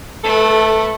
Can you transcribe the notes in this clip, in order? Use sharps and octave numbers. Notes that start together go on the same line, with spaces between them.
A3 A4 B4